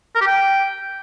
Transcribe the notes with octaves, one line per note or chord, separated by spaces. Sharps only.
A#4
G4
G5